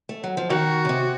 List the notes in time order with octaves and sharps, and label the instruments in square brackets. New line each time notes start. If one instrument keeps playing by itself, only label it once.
[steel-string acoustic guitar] A3
F#3
F3
[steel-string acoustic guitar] D#3 [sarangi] F#4
[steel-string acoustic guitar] C#3
C3